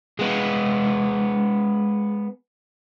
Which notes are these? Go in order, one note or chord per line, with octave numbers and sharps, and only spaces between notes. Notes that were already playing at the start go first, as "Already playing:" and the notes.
G#3 B3